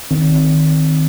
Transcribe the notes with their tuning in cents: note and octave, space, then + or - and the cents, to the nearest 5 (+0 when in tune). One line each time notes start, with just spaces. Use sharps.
D#3 +0 C4 +0